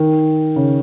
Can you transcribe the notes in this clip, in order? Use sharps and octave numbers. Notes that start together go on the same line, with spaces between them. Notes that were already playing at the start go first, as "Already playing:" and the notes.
Already playing: D#3
C#3